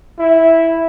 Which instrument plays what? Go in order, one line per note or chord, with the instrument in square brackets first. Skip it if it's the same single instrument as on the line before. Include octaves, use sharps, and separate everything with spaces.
[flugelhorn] E4